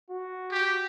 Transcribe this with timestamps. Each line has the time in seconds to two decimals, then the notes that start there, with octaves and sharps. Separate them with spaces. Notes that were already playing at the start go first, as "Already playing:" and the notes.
0.10 F#4
0.52 G4